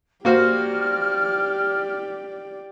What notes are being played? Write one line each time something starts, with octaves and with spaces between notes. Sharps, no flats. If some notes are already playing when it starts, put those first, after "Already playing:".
A#3 F#4 G4 C5 D5 F6